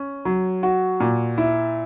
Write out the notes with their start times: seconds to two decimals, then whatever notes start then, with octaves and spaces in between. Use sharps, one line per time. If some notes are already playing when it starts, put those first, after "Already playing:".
Already playing: C#4
0.25 F#3
0.63 F#4
1.00 A#2
1.38 E4